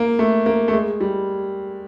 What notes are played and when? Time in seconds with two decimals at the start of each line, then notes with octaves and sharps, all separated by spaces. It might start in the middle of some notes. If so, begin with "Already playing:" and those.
Already playing: A#3
0.19 A3
0.46 A#3
0.68 A3
0.73 G#3
1.01 G3